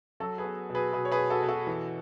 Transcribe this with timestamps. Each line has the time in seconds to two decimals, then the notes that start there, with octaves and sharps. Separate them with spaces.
0.20 F#3 F#4 A4
0.38 G#4 B4
0.45 B3
0.70 B2
0.75 G#4 B4
0.93 B2 G#4 B4
1.05 C#5
1.12 G#4 B4
1.18 B2
1.30 F#4 A4
1.42 B2
1.49 F#4 A4
1.67 E3